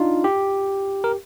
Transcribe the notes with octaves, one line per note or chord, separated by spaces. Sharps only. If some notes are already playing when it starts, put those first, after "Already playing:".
Already playing: D4 D#4 F4
G4
A#4